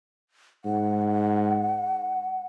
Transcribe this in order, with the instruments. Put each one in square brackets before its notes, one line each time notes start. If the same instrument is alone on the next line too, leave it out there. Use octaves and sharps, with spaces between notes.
[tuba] G#2 [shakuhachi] F#5